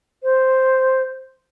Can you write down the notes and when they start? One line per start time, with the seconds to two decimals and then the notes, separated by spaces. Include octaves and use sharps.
0.23 C5